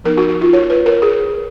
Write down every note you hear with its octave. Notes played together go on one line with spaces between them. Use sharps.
F3 B3 D#4 A#4
F#4
F#4
F4
C#5
B4
A#4
G#4